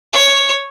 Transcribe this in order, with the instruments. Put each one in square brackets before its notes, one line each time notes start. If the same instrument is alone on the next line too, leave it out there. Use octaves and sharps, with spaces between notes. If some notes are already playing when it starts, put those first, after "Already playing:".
[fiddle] C#5